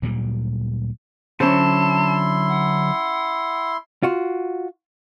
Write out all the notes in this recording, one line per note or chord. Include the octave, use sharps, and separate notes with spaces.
D2 A#2 F#3 G3
D3 F#3 C#4 E4 C5 A5 C6
F#5
F4 F#4